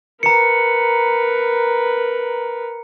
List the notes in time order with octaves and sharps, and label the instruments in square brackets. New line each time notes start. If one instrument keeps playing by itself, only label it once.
[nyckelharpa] A#4 B4 [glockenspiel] A#5 C#7